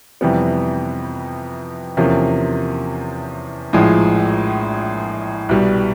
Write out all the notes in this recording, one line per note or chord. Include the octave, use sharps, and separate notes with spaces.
F2 C3 E3 G3 B3
E2 C3 F3 A#3 C#4
A#1 A2 F3 G#3
C2 B2 G3